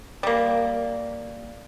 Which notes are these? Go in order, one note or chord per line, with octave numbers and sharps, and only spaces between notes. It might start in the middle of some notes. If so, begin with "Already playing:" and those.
G3 A#3